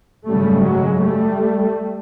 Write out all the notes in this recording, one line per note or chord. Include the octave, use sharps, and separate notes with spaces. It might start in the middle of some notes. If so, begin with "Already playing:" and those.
G#1 F#2 C#3 G3 A3
F#3 G#3
G3 A3